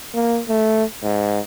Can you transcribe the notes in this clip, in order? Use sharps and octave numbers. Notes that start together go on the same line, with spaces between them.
A#3
A3
G#2